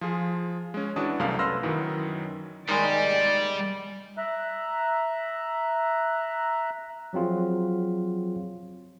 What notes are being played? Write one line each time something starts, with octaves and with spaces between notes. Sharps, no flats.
F3 F4 G#4
G#3 C#4
E3 D4 F#4 A5 D#6
C2 F#2 C3 A3 D5 F5
B4 C6 E6 F6 A#6
F#2 D#3 E3 F#3
D#3 G3 G#3 D5
E5 A#5 F#6
F3 F#3 C4 F4 G#4